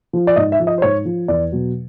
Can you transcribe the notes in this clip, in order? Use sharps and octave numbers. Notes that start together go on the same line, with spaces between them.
F3
D5
G#2 D#5
E5
F3
D#5
C5
G#2 C#5
F3
E2 D5
B2 F#3